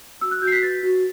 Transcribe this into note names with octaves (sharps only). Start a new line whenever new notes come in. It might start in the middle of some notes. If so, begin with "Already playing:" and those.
F#4 E6
F#6
F#4 G6
C7
B6
B4 A6
F#4